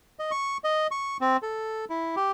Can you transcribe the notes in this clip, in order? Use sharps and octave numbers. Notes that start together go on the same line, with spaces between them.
D#5
C#6
D#5
C#6
C4
A4
E4
G4